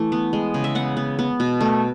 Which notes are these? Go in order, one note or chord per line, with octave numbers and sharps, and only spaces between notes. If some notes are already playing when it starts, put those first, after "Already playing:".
Already playing: E3 A3
B3
G#3
C#3
E5
B3 F#5
B3
B3
B2
A3